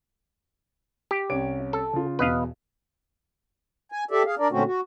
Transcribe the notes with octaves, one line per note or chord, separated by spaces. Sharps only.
G4
C2 C#4 D7
A4
C#3 F4
E2 B2 B4 D#5 F5
G#5
G4 A4 D5 E5
G#4 F5
D4 A#4 D5
A#2 D3 A3 C4 C#4 F#4
F#4